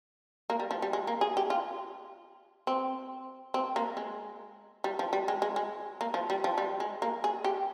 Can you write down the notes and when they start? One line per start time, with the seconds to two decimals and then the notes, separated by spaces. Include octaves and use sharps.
0.50 A#3
0.60 G3
0.71 F3
0.82 G3
0.93 G#3
1.07 A#3
1.21 G#4
1.37 G4
1.50 F4
2.67 C4
3.54 C4
3.76 A#3
3.97 G#3
4.84 G3
4.99 F3
5.13 G3
5.28 G#3
5.42 G#3
5.56 G#3
6.01 A#3
6.14 F3
6.30 G3
6.44 F3
6.58 G3
6.80 G#3
7.02 A#3
7.24 G#4
7.44 G4